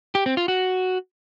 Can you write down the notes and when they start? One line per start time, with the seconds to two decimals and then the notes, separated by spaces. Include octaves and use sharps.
0.15 G4
0.26 C4
0.37 F4
0.48 F#4